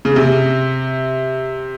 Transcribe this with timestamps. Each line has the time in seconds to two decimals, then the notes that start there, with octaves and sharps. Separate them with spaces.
0.05 C#3
0.16 C3